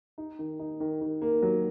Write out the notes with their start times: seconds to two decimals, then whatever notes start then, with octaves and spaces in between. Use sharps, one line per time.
0.18 D#4
0.39 D#3
0.59 D#4
0.80 D#3
1.01 D#3
1.22 A#3
1.42 F#3